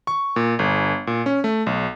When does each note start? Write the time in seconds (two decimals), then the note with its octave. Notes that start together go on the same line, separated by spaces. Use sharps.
0.07 C#6
0.36 A#2
0.59 G1
1.07 A#2
1.26 C#4
1.44 A3
1.66 B1